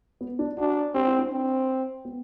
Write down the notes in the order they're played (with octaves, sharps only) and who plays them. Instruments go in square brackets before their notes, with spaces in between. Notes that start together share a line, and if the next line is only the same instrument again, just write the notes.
[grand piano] B3
D4
[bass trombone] D4 [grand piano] F#4
[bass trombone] C4 [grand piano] G4
[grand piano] E4
D4
[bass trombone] C4
[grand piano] B3